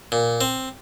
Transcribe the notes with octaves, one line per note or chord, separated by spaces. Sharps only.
A#2
C4